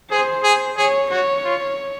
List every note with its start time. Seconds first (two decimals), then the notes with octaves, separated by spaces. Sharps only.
0.10 G#4 C5
0.43 G#4
0.77 G#4 C#5
1.11 F#4 C#5
1.45 F4